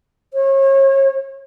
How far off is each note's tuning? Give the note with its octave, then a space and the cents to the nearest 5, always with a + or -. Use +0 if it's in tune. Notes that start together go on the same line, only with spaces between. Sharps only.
C#5 -35